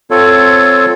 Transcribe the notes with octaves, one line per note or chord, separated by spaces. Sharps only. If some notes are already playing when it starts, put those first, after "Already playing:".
C4 F4 A4 C#5